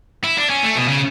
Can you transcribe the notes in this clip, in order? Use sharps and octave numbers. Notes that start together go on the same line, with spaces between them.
E4
D4
C#4
A3
B2
C#3